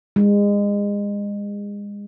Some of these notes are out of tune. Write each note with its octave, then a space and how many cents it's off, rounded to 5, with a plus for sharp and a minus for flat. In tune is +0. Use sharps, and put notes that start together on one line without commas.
G#3 -30